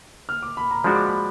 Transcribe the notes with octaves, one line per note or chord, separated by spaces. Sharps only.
F6
D6
B5
A#5
F3 G#3 D4 F#4 B5
D6
B5